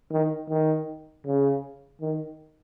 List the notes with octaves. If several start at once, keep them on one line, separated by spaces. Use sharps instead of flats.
D#3
D#3
C#3
D#3